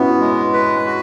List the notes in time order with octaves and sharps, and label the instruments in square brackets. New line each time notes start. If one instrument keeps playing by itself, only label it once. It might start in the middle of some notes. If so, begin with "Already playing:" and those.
Already playing: [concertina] B3 [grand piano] C#4 E4 F#4
[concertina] G#3
B4
F#4